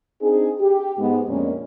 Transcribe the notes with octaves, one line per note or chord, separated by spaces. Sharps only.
C4 D4 D#4 G#4
G4
G#2 G#3 B3
F2 A#2 G#3 A#3 C#4 D4